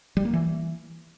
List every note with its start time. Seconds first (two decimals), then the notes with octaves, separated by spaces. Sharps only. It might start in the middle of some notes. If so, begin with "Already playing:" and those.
0.17 G3
0.25 A#3
0.33 E3